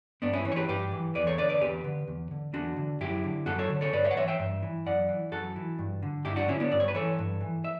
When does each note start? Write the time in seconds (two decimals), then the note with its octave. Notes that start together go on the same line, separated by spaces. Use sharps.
0.22 G2 B3 D4
0.33 C#4 E4
0.45 E3 C#4
0.52 C#5
0.56 G4 B4
0.68 G2 G4 B4
0.91 E3
1.15 E2 B4 D5
1.27 A4 C#5
1.38 D3 B4 D5
1.49 B4 D5
1.61 E2 G4 B4
1.84 D3
2.07 E2
2.31 D3
2.54 E2 D4 F#4
2.76 D3
3.01 F#2 E4 G4
3.24 D3
3.46 F#2 F#4 A4
3.59 A4 C#5
3.70 D3
3.81 A4 C#5
3.93 G2 B4 D5
4.04 C#5 E5
4.11 F#5
4.16 E3 C#5 E5
4.28 E5 G5
4.39 G2
4.62 E3
4.86 F#2 D5 F#5
5.08 E3
5.32 F#2 F#4 A4
5.56 E3
5.79 G2
6.02 D3
6.25 G2 E4 G4
6.36 D4 F#4
6.48 D3 C#4 E4
6.60 B3 D4
6.72 G2 D5
6.80 C#5
6.88 B4
6.94 E3 A4 C#5
7.18 G2
7.41 E3
7.64 E5